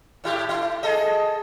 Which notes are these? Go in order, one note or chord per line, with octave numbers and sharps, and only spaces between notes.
A2 E4 G4
E4
G#4 A4 D#5